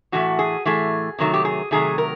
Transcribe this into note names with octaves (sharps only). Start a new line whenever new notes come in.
A2 E3 A3 F#4
G#4
A2 E3 A3 G#4
C3 D#3 F#3 A3
G4
G#4
C3 D#3 F#3 A3 G#4
A#4